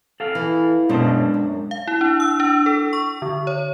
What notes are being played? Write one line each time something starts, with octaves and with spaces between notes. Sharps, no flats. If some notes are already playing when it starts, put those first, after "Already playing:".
A4 F5
E3
F#2 B2 G#3 D4 C5 A5
F#2
F5
E4
D4
E6
D4
A4
C#6
D3
C#5